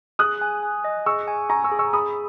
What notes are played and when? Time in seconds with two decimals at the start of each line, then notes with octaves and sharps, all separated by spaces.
0.19 G#4 D#6 F#6
0.41 G#5
0.63 G#5
0.84 D#5
1.06 G#4 C#6 E6
1.28 G#5
1.50 G#5 A#5 C#6
1.64 C#6 E6
1.71 G#4
1.79 C#6 E6
1.93 G#4 B5 D#6